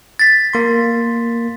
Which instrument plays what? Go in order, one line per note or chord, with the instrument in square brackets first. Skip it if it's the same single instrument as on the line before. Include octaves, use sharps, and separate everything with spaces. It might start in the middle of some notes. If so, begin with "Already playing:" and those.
[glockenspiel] A6 B6
[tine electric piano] A#3 C6